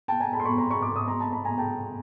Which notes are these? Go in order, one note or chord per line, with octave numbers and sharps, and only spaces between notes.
G5 A5
G#5 A#5
A5 B5
C6
B5 C#6
A#5 C6
B5 C#6
C6 D6
C#6 D#6
A#5 C6
A5 B5
A5 B5
G#5 A#5
G5 A5